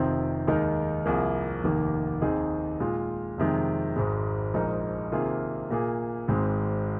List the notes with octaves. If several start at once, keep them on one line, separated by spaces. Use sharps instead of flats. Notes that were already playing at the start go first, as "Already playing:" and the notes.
Already playing: F1 F2 C3 D#3 C4
D#2 D#3 G#3 D#4 A#4
C2 C3 F3 A#3 G#4
F1 D#2 D#3 A#3
D#2 D#3 C4 D#4 G#4
A#2 G#3 F4
F2 C3 D#3 G#3
G#1 G#2 G#3
A#1 G#2 G#3 D#4 A#4
C3 D#3 A#3 F4 G#4
A#2 A#3 G#4
G#1 G#2 G#3 C4